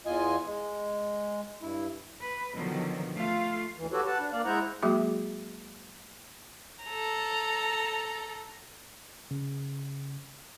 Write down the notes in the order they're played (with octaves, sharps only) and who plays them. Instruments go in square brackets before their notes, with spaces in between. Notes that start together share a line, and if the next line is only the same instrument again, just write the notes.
[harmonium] E2 F4 D#5 G#5
G#3
G2 E4
[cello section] B4
B2 D3 D#3 F3 F#3
A3 F4 F5
[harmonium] D2 E3
F#4 G4 A4 B4 C#5
B4 F#5 A5
D4
A#3 D5 F5
G#3 E4 C5 F#5 A#5
[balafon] F#3 G#3 A#3 F#4 G#4 E5
[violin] A4 A#5
[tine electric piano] C#3